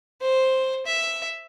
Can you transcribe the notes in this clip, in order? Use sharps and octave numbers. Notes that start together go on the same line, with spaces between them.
C5
E5